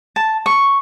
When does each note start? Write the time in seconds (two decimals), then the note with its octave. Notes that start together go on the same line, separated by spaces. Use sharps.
0.16 A5
0.46 C#6